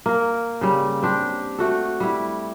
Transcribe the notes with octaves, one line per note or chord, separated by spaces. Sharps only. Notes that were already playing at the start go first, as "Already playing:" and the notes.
A#3 A#4
C#3 G3
C4 D4 G4
A3 F#4 A4
G3 E4